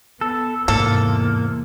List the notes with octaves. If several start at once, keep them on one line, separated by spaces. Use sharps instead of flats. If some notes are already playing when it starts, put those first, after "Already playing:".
B3 A4
E2 G#2 C3 A#3 A4